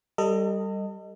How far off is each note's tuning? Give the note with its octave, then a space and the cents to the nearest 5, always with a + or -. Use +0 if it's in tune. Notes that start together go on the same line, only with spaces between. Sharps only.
G3 +0 A4 +35 D#5 +0